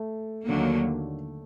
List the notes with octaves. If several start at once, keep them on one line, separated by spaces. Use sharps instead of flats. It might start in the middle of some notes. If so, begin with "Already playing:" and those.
Already playing: A3
D#2 D3 F#3 A#3